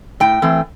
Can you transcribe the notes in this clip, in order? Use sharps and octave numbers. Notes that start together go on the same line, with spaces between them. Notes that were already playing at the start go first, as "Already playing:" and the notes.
A2 G5
E3 A3 C4